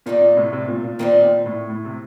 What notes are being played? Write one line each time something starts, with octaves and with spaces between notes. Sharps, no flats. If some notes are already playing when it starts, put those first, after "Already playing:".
A#2 D#3 G3 A#3
A#2
A2 C3
A2 C3
A#2
A#2
A#2 D#3 G3 C4
A#2
A2
A2
C3